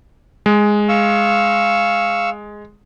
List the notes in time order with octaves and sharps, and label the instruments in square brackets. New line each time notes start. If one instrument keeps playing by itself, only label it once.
[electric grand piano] G#3
[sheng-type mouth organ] F5 C#6 E6